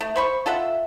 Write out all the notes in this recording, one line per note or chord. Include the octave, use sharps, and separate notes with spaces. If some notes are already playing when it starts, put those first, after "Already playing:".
A3
C5 B5 C#6
F4 A4 E5 F#5